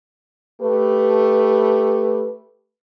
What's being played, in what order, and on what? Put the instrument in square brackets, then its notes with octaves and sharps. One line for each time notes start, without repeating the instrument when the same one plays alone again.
[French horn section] A3 G4 B4